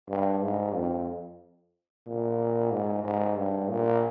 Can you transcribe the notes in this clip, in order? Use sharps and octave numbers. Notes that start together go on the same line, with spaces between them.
G2
G#2
F2
A#2
G#2
G#2
G2
A#2